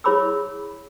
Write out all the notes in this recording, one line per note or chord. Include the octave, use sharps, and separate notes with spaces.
E4 G#4 C#5 B5 D6 E6